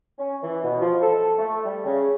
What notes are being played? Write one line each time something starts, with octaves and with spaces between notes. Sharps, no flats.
C#4
E3
B2
F3
A4
A3
G3
C#3